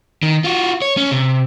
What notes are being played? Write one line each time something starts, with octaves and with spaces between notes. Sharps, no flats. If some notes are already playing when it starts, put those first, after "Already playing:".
D#3
F4 F#4
C#5
C#4
C3